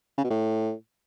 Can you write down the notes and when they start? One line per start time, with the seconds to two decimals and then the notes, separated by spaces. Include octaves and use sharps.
0.18 C#3
0.24 B2
0.30 A2